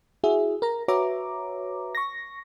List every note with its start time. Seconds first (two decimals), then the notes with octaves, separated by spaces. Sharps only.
0.24 E4 F#4 G#4 E5
0.62 A#4 A#5
0.88 F#4 B4 C#5 E5 A#5 D6
1.95 C#6 A#6